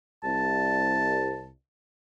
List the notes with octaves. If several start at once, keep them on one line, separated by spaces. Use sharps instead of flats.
C2 A5